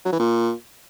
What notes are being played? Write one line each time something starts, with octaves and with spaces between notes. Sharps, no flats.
F#3
E3
A#2